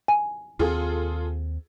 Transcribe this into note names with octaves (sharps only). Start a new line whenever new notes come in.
G#5
D#2 B3 C4 F4 G#4 A4